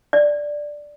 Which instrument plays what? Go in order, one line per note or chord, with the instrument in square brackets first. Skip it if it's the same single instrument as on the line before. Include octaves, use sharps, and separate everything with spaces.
[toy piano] D5